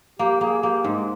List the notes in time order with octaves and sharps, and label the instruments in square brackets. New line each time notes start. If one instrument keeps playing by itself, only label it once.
[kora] A#3 [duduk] G4
[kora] A#3 [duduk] G#4
[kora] A#3 [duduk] G4
[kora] G#2 [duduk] G#3